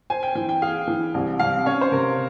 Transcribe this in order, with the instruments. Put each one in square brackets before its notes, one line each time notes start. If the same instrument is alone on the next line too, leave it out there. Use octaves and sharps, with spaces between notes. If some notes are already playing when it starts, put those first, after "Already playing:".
[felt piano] C5 [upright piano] G#5
[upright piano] G5
[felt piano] E3 [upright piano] G5
[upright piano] G5
[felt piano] G#4 [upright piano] F5
[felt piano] E3
C2
[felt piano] C2 [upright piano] F5
[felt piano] C#4 [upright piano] C#5
[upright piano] C5
[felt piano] C3 [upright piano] A#4